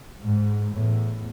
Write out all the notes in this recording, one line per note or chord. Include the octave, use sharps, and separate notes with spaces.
G#2
E2 A2